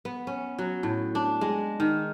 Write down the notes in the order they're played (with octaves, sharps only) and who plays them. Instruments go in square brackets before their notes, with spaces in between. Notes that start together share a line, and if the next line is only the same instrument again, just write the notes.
[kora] B3
C#4
F#3
A2
D4
G#3
D#3